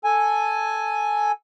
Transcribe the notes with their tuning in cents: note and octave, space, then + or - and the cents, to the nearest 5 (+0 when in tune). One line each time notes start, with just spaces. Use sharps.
A4 +0 G#5 +0